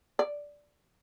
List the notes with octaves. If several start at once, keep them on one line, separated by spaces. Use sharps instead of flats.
D5